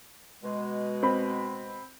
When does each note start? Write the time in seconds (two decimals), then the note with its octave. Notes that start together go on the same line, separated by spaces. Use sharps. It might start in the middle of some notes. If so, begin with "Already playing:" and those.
0.43 B2 G#3
1.03 C4 B5